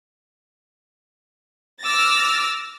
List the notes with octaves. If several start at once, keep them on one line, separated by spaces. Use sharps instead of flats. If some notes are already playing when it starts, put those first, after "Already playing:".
D6 E6 F6 A6 A#6